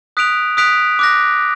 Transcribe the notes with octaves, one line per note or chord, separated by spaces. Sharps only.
D#6 F#6 B6 D7 F7
D#6 F#6 B6 D7 F7
D6 F#6 A#6